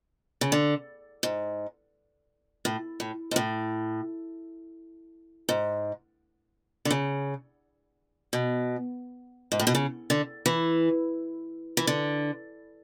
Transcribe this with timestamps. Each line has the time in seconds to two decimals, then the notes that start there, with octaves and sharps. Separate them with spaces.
0.41 C#3
0.52 D3
1.23 G#2
2.65 A2
3.00 A2
3.31 G#2
3.36 A2
5.49 G#2
6.85 D3
6.91 C#3
8.33 B2
9.52 G#2
9.60 A2
9.67 B2
9.75 C#3
10.10 D3
10.46 E3
11.77 E3
11.87 D3